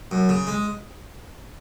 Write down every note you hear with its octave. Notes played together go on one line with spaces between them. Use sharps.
F#2
C#3
G#3